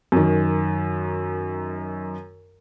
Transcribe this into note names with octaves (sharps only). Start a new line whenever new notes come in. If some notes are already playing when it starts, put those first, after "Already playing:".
F#2 D#3